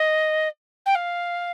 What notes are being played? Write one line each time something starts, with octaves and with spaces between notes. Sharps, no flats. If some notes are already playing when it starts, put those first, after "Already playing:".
Already playing: D#5
G5
F5